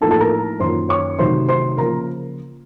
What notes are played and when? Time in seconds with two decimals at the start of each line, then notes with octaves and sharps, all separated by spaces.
0.01 A2 F3 A#3 D#4 A4 A5
0.11 A4 A5
0.20 A#4 A#5
0.60 F#2 D#3 A#3 C#4 F4 C5 C6
0.89 C#5 C#6
1.19 C3 D#3 F#3 A3 C5 C6
1.49 C5 C6
1.77 C#3 F3 A#3 A#4 A#5